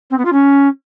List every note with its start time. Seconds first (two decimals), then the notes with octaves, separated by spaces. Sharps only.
0.10 C4
0.18 B3
0.25 F4
0.32 C#4